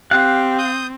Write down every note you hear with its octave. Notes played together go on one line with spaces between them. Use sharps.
C4 G4 F5 F#6
D#6 G6